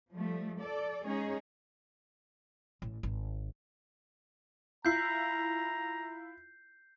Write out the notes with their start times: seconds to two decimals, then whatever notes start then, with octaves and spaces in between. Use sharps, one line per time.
0.12 F3 G3 A3
0.59 A4 D5
1.04 G#3 C#4 D#4 G#4 C#5
2.82 A1
3.03 G#1
4.85 E4 F4 A#5 G6 C7